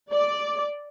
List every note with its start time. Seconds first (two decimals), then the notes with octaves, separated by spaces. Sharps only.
0.13 D5